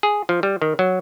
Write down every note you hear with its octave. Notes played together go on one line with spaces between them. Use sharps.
G#4
F3
G3
D#3
F#3